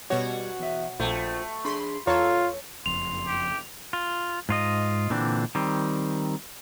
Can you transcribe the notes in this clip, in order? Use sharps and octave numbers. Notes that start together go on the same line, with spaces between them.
B2 G3 F#4 C#5
E2 E5
A#1 A3 F4 C5 G5
D4 G#4 B5 C6
E2 F4 A4 C#5 A#5
F#1 F2 C6 F7
G4
F4
G#2 F4 D#5
A#2 D3 E3 C4 D4
D#3 G3 C4